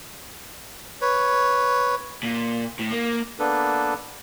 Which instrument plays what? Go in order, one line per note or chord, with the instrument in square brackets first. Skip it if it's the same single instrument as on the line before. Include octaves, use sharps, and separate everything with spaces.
[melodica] B4 C#5
[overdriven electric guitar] A#2
A2
A#3
[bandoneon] A#3 B3 D4 A4 B4